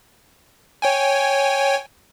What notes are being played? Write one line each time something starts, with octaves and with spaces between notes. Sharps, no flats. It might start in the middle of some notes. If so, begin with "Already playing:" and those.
C#5 G5 G#5